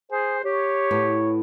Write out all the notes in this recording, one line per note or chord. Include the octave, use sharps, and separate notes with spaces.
G#4 C5
G4 C#5
A2 B3